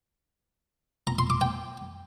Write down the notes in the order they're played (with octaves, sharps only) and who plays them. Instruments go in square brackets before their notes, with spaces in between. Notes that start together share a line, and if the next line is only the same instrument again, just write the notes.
[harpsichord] A#5
C6
D6
G5